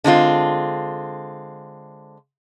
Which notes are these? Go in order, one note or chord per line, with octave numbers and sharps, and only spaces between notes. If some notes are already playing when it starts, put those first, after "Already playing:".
D3 G#3 C4 F4